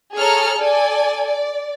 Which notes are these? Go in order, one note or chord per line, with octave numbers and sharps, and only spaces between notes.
G#4 A4 C#5 A#5 F6 C#7
A4 D5 G#5
D5